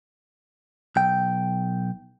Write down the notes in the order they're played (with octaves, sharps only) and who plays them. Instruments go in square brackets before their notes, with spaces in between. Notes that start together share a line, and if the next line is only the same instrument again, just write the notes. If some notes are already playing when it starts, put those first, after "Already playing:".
[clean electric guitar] B1 G5